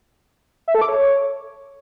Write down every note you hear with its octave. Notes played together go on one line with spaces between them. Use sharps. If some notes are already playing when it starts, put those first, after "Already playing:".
E5
A4
D6
C#5